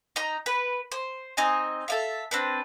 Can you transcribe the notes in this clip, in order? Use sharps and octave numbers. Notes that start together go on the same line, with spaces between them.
D#4 A#5
B4
C5
C4 D#4 D#5 G#5
A4 E5 F5
C4 D4 B4